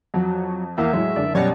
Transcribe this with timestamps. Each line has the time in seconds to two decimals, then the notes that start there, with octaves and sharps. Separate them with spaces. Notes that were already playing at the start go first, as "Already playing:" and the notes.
0.14 F2 F#3
0.78 E2 A#3 E5
0.93 A2 F#3 G#3
1.16 F#1 D3 D5
1.35 F#2 B2 G3 C#5